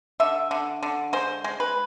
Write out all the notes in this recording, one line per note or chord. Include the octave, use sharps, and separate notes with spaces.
D3 E5
D3
D3
G#3 C5
G#3
B4